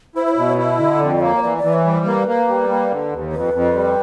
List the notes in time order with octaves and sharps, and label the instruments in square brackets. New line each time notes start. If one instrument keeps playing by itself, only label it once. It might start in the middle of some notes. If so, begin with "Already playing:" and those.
[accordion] E4 [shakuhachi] C5
[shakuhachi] C5
C#5
[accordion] B2
[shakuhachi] C#5
[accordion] E4
[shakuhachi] E5
[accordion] D3 [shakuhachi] D#5
[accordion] F2 [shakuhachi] D5
[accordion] A#3 [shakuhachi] C#5
[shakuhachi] C#5
[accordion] E3 [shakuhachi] D5
[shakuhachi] D5
[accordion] E3
[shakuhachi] C#5
[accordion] G3
[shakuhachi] C5
[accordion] A#3 [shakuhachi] B4
[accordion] A#3
G3
A#3
D3
D#2
[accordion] F2 [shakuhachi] B4
[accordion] F2
G3